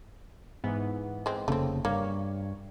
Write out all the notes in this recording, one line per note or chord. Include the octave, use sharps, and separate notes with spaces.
G#2 E3 B3
G#3 C4
F1 C#3 A3 A#3 C4
G2 A#3 C#5